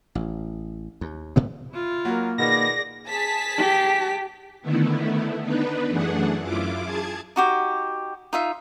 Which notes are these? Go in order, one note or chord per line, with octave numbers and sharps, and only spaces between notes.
A1
D#2
C2 A2 C3 B3
E4 F4
F#3 A#3 A#4
B2 D#3 B3 G#4 D5 A#6
G#4 A5 B6
G4
D3 D#3 A3 B3 E4
B3 D4 D#4 B4
F#2 E3 A3 D4 G#4 F#5
F#2 E4 F4 D6
G#4 A5 G#6
D#4 F#4 G4
D#4 F4 E5